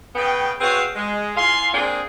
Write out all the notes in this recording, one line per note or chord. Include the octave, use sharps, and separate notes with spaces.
C#3 B3 G5
C4 F#4 G#4 B4 C#5 F5
G#3
E3 F4 F5 G#5 C6
A#3 C4 D4 G#4